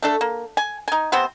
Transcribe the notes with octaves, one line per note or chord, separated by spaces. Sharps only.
A3 D4 A4
A#3
G#5
D#4 G#5
C3 B3 C4 C5